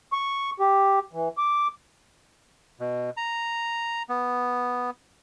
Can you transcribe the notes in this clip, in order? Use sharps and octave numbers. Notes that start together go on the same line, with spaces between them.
C#6
G4
E3
D6
B2
A#5
B3